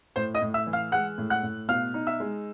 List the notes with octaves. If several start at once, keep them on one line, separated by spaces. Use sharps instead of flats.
A2 C5 C6
D#5 D#6
A2
E5 E6
E3
F5 F6
G#3 F#5 F#6
A2
F#5 F#6
A2
B2 F5 F6
D#4
E5 E6
G#3